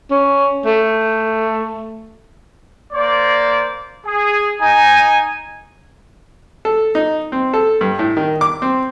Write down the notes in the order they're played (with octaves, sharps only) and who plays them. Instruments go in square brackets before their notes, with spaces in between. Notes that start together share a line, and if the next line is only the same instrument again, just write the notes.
[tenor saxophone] C#4
A3
[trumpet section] A#3 C5 D5
G#4
D#4 G#5
[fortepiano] A4
D#4
C4
A4
G2
A2
D#3
D6
C4